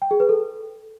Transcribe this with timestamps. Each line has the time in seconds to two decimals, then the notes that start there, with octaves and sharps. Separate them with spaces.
0.02 G5
0.11 G#4
0.20 B4
0.29 A4